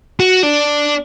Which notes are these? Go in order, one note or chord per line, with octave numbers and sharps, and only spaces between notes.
F#4
D4